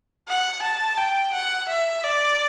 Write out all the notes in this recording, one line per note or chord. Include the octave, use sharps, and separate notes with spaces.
F#5
A5
G5
F#5
E5
D5